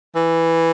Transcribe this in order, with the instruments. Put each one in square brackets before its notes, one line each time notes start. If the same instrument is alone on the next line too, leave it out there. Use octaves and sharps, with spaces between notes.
[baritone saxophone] E3